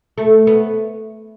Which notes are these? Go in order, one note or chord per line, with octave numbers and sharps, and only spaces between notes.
A3
B3